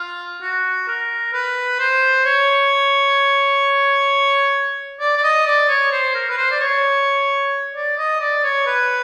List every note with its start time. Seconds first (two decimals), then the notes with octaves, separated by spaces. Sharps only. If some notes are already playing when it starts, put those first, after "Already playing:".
Already playing: F4
0.42 F#4
0.88 A#4
1.33 B4
1.79 C5
2.25 C#5
5.00 D5
5.16 D5
5.23 D#5
5.46 D5
5.69 C#5
5.92 C5
6.15 A#4
6.30 B4
6.37 C5
6.51 D5
6.60 C#5
7.74 D5
7.98 D#5
8.21 D5
8.44 C#5
8.66 B4